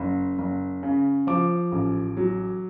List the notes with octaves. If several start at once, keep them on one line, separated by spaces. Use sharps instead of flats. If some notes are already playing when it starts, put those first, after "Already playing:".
Already playing: F#1
F#1
C#3
F3 D6
A1
F#3